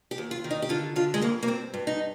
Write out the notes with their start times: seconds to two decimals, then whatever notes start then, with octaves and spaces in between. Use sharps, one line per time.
0.11 G4
0.18 D#2
0.31 F4
0.44 D#3
0.50 D#4
0.62 G4
0.69 D3 F4
0.96 D3 F4
1.14 G#3
1.21 F2 A#3
1.43 A#3
1.47 G2 C4
1.74 G2
1.87 D#4